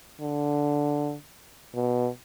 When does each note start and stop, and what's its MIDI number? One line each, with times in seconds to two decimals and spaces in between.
0.21 1.15 50
1.75 2.09 47